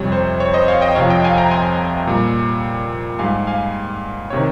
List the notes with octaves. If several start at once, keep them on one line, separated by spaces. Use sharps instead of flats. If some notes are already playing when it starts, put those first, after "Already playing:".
Already playing: F2 C3 G3 C#5
C5
C#5
C5 D#5
C#5 F5
D#5 G5
F2 C3 F3 C#5 F5
D#5 G5
F5 G#5
G5 A#5
G#5 C6
A#2 G3
G#2 G3 F5 G#5
F5 G#5
C3 D#3 C#5